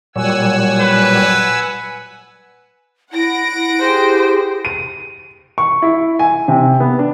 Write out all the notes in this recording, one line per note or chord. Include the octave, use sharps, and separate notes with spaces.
A#2 F#3 G3 F#5 G#5 E6
B4
E4 F#5 A#6 D7
E4 G4 G#4 C5
D#7
C#6
E4
G#5
C3
B3
D4